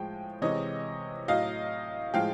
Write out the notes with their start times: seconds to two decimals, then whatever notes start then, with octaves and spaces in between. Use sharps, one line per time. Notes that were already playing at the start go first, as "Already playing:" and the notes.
Already playing: A2 F3 G#3 G5
0.42 C3 E3 G#3 C#5 D#5
1.28 A2 F#3 D#5 F5
2.14 A2 F3 G#3 F5 G5